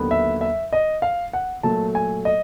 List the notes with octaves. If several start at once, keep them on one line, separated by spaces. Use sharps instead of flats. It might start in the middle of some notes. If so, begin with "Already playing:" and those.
Already playing: D#2 D3 F#3 B3
E5
E5
D#5
F5
F#5
A#2 F#3 A3 A5
G#5
D#5